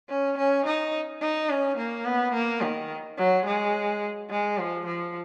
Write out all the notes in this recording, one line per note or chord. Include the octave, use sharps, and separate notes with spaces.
C#4
C#4
D#4
D#4
C#4
A#3
B3
A#3
D#3
F#3
G#3
G#3
F3
F3